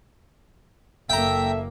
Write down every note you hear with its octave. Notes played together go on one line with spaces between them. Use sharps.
F#1 A#3 A4 E5 G5 A#5